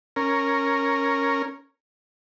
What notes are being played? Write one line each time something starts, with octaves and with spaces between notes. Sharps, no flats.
C#4 A#4